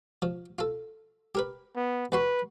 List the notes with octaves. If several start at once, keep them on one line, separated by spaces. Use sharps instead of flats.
F3
F4 A4
G4 A#4 B4
B3
E2 F#4 B4 C6